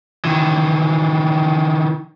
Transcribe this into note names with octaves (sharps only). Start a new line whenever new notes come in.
D#3 E3